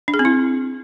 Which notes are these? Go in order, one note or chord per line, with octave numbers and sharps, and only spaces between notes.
D4
G#4
C4
E4